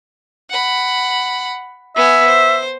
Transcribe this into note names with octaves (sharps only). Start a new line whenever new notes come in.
F#5 B5
B3 E5 G#5
C5